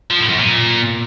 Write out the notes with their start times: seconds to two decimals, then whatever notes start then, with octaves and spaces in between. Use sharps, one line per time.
0.11 F3
0.20 A2
0.29 F#2
0.38 A#2